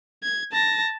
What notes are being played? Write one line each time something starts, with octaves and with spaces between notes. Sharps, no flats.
G#6
A5 A#6